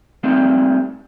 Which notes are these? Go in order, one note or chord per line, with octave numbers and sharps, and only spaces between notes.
G3 A3 A#3 C4 D#4